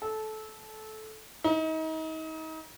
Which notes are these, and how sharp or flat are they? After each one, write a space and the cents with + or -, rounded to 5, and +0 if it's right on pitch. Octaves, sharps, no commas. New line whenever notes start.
A4 -20
D#4 +35